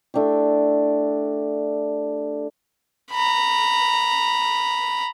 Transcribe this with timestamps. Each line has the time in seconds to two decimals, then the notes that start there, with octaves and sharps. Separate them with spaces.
0.14 A3 D4 E4 G4
3.11 A#5 B5